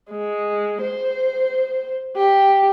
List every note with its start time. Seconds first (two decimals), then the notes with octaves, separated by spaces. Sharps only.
0.11 G#3
0.82 C5
2.16 G4